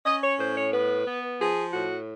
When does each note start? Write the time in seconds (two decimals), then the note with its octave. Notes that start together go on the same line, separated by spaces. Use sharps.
0.06 C#4 D#5
0.22 C#5
0.39 A2 C5
0.56 C#5
0.73 B3 B4
1.06 B3
1.40 F3 G#4
1.73 A2 F#4